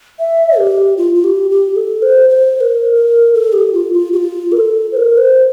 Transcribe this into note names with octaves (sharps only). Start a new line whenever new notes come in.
E5
G4
F4
F4
G4
G4
A4
C5
C5
C5
A#4
A#4
A4
G4
F4
F4
G4
F4
A#4
A4
C5
A#4
C5